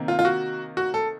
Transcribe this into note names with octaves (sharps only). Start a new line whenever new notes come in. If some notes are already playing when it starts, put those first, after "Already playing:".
Already playing: C3 D#3 A#3
F4
F4
F#4
F#4
A4